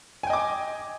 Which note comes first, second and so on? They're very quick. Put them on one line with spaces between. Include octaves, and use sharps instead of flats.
G#5 G5 D#5 D6